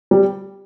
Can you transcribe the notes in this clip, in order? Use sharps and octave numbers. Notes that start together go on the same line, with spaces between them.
G3